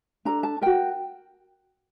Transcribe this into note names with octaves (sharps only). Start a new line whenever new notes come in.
D4 A4 A#5
A5
F#4 A#4 G5